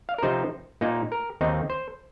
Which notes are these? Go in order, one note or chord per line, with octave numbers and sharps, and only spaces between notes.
F5
A#4
C3 F3 C4 D#4 C5
A#2 A#3 D#4
A#4
D#2 D#3 C4 D#4
C5